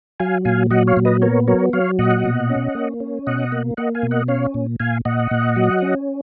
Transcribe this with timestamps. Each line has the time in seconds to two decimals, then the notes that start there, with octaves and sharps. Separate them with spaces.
0.20 F#3 F5 G#5
0.45 A#2 F5 G#5
0.71 F#3 D#5 F#5
0.87 C#5 F5
0.97 A#2
1.05 B4 D#5
1.22 B3 A#4 C#5
1.47 F#3 A#4 C#5
1.73 F#3 C#5 F5
1.99 A#2 D#5 F#5
2.24 B2
2.50 C#4
2.75 A#3
3.00 C#4
3.27 B2 D#5 F#5
3.52 A#3
3.77 A#3 D#5 F#5
3.95 F5 G#5
4.03 B2
4.11 D#5 F#5
4.28 C#4 C#5 F5
4.54 A#2
4.80 A#2 F5 G#5
5.05 A#2 D#5 F#5
5.31 A#2
5.56 F#3
5.82 C#4